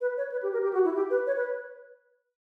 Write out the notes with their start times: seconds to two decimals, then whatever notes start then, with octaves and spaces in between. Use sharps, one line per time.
0.01 B4
0.17 C#5
0.32 B4
0.43 G4
0.53 A#4
0.63 G4
0.73 F#4
0.85 E4
0.95 G4
1.10 B4
1.27 C#5
1.37 B4